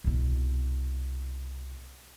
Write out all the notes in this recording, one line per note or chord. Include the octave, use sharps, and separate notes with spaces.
C2 B2